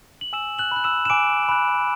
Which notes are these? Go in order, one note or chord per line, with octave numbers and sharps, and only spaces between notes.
F#7
G#5 E6 E7
F#6 F#7
B5 F#6
E6 E7
E7
G#5 D6 D7
B5 F#6